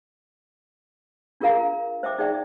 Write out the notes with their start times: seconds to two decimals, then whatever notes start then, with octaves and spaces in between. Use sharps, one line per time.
1.41 D4 F4 G#4 A#4 F5 A#5
2.03 C5 E5 G5 D6
2.18 D#4 G#4 D5 E5 G5